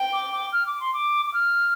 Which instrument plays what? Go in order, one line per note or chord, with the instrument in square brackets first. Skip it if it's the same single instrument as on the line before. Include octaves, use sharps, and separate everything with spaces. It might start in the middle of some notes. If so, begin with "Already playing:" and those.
Already playing: [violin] G5
[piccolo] D6
D6
F6
D6
C6
D6
D6
F6